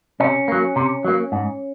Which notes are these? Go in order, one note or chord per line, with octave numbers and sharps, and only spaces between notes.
C3 C#4
F#3 A#3
C3
F#3 A#3
G#2